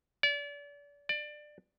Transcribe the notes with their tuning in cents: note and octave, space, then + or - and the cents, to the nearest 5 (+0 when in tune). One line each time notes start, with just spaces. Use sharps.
D5 -35
D5 +20